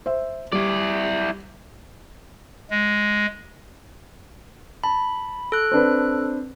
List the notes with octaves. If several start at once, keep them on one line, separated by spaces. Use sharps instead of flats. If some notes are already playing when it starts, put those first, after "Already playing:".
C5 E5
G3 E4 D5
G#3
A5 B5
A4 F#6
C4 D4 B4